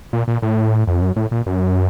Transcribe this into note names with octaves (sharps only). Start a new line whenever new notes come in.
A#2
A#2
A2
F2
F#2
A2
A#2
F#2